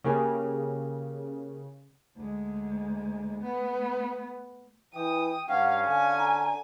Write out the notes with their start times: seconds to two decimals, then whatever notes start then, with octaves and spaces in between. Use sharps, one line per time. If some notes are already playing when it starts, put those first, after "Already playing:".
0.04 C#3 A#3 G4 G#5
2.16 D2 G#3
3.43 A3 B3
4.95 E3 G5 D#6
5.49 G2 C#4 F5 F#5
5.87 D3 F5 G#5
6.18 A#5